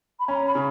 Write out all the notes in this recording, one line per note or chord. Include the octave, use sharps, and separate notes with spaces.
B5
C#4 A#5
B5
C#3